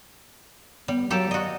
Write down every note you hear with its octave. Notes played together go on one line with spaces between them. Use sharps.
G3 B3
F#3 A#3 G4 A4
F#4 D5 D#5